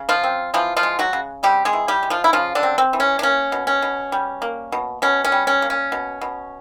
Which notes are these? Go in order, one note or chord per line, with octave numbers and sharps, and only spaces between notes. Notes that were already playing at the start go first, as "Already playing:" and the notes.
Already playing: C#3
F3 F4
C4
E3 F3 F4
F3 F4
G#3
F#3 F#4
C#3
G3 C4 G4
G#3 G#4
E3
G3 G4
G#3
F3 F4
E4
C#3 F3 F4
D3 D4
C4
C4
E3
C#4
D4
A#3 C#4
B2
C#4
B2
G3
A#3
B2
B2 C#4
C#4
G3
C#4
A#3
C#4
B2
B2